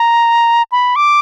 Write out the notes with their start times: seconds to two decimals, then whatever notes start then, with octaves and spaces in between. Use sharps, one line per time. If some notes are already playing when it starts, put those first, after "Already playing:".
Already playing: A#5
0.72 B5
0.96 D6